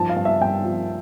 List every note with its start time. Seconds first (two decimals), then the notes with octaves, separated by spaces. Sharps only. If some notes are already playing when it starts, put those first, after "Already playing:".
Already playing: G2 F3 A5
0.09 F5
0.16 G2
0.25 E5
0.41 G2 G5
0.64 F3